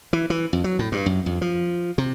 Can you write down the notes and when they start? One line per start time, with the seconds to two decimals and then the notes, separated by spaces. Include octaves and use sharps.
0.13 E3
0.30 E3
0.53 F2
0.64 F#3
0.79 A2
0.92 G2
1.06 F#2
1.26 F2
1.41 F3
1.98 C3